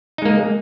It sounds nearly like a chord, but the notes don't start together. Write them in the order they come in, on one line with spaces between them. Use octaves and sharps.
D#4 G#3 A#3